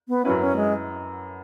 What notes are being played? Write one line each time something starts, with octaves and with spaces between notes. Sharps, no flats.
B3
F#2 F#3 C#4 E4 B4
C#4
G#3